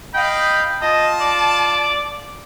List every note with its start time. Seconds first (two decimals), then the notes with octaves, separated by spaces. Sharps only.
0.14 D#5 F5 G5 B5
0.82 F4 D#5 A5
1.20 D5